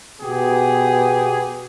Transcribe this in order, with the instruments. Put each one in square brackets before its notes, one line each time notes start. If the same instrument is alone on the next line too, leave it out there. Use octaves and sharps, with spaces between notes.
[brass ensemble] B2 B3 G4 G#4